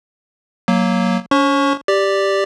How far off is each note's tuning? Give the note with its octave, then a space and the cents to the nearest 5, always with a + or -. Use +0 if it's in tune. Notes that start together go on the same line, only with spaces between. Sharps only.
F#3 +0 A#3 +0
C#4 +35 C#5 -40 C#6 +0
G4 +0 D5 +0